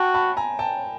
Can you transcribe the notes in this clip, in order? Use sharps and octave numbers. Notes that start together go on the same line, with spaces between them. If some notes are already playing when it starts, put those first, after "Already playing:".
Already playing: F#4 G5 A5
A5 B5
G#5 A#5
G5 A5